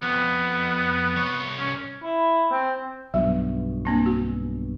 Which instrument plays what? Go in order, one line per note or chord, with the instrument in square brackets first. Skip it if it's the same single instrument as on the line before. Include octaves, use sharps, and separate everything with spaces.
[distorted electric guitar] F2 [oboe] B3
[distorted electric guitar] C2 C#5
[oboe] C#4
[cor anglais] E4
C4
[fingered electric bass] B1 G2 B2 [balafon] F#3
[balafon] A#3 C4 D4
F#4